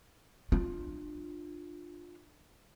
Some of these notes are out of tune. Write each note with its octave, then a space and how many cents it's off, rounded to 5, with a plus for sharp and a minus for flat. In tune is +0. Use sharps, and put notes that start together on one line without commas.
D4 +30 F4 +15